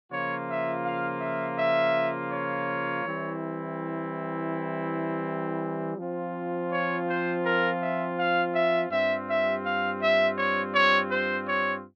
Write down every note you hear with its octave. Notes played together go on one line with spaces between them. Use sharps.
C#3 F3 A#3 F4 C#5
E5
F5
E5
E5
C#5
E3 G3 C4 E4
F3 C4 F4
C#5
C5
A#4
E5
F5
E5
G2 G3 C4 F4 E5
E5
F5
E5
C#5
C#5
C5
C#5